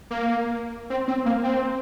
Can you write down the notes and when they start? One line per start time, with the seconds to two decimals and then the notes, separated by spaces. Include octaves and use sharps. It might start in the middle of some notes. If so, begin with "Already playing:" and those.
0.11 A#3
0.90 C4
1.08 C4
1.26 A#3
1.43 C4